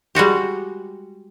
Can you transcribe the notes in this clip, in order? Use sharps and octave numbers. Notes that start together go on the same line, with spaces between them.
G3 G#3 F#4 G4